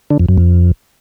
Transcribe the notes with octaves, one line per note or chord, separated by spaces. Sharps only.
D3
F2
F#2
F2